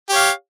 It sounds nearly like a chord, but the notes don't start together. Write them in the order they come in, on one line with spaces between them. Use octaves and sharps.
G4 C#5 F5